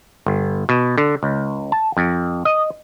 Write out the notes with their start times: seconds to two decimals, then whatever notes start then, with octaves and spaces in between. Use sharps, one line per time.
0.26 G1
0.69 B2
0.98 D3
1.23 C#2
1.72 A5
1.97 F2
2.45 D#5